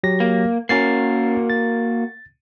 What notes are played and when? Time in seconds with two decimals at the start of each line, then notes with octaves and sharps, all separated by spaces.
0.04 F#3 G4 A#6
0.20 A#3
0.69 A#3 C#4 F#4 A#4 A6 C7
1.50 A6